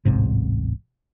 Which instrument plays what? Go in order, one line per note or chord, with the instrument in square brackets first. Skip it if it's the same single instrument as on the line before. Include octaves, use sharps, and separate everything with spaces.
[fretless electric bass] D1 A1 G#2 C3